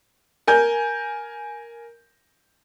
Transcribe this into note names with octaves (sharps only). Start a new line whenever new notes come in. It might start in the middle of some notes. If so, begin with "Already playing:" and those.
A#4 G#5 G6